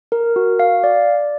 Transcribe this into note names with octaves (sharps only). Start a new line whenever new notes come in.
A#4
F#4
F5
D5